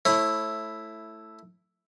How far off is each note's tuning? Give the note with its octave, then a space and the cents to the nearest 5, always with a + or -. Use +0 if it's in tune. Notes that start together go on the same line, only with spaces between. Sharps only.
A3 +0 E4 +0 C#5 -35